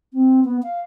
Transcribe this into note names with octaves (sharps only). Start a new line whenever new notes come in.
C4
B3
F5